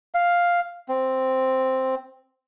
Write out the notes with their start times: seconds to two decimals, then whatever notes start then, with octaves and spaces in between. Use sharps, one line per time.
0.14 F5
0.89 C4